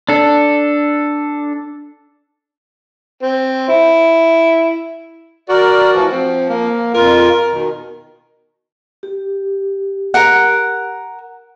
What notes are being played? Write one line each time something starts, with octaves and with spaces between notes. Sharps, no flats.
D4 A4
C4
E4
F#4 A#4 D5
A2 E3 F3
F3 C4
A#3
F2 F4 A#4
B2 D#3
G4
A#4 F#5